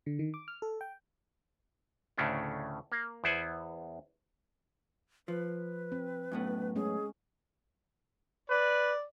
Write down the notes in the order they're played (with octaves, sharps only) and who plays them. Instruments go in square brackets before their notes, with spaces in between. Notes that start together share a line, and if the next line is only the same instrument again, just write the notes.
[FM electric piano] D3
D#3
D6
F6
A4
G5
[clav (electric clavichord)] D2 A2 C#3 A3 C#4 D4
A#3
E2 B3 E4 C5 F#5 G#5
[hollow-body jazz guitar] F3 [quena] B4
[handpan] C4
[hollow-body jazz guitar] F#2 A2 B3
[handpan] G#3 C#4 [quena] G#4
[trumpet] B4 [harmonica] D5